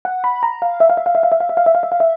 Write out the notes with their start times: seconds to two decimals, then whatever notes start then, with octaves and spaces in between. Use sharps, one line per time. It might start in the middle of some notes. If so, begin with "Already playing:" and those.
0.05 F#5
0.24 B5
0.43 A#5
0.62 F5
0.80 E5
0.90 F5
0.97 E5
1.06 F5
1.15 E5
1.23 F5
1.32 E5
1.40 F5
1.49 E5
1.57 F5
1.66 E5
1.75 F5
1.83 E5
1.92 F5
2.00 E5